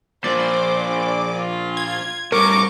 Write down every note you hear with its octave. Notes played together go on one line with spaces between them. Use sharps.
A#2 F3 C5 D5
F4
G#6
A2 G3 A#4 C#6 D6